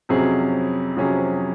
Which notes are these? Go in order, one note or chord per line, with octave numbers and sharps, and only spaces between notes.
F2 C3 F#3 C#4 G#4
F2 C3 F#3 C#4 G#4